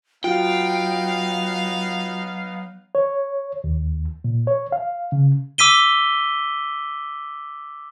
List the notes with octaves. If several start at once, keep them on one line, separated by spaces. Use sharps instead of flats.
F#3 B3 D#4 F4 F#4 F5 G5
C#5
D#2
A#2
C#5
F5
C#3
D6 E6 B6 D#7 G7